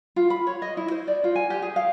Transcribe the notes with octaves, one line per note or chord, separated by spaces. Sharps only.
F4
B5
C#5
D#5
E4
C5
D5
F4
G#5
G4
G#4
F5